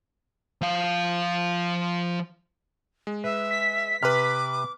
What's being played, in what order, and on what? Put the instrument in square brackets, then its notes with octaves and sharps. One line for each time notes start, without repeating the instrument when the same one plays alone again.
[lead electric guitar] F3 F5
[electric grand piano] G#3
[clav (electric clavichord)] B4 [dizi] E5
[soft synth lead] B6
[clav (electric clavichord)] C3 [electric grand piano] B4 B5 F6 [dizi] D6